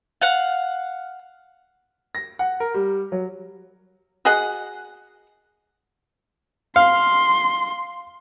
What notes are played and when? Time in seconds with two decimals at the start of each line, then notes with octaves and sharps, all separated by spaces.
0.22 F5 F#5
2.15 A#6
2.39 F#5
2.60 A#4
2.74 G3
3.12 F#3
4.25 F#4 G#4 D#5 F#5
6.76 F5 C6